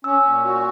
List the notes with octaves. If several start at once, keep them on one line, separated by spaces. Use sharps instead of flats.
C#4 E6
A#2
F#4